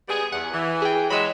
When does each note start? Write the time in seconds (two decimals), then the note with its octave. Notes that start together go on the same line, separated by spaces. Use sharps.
0.09 G3 B3 G#4
0.32 E2 F#5
0.54 E3
0.82 G#4 G5
1.10 F#3 G#3 B5 E6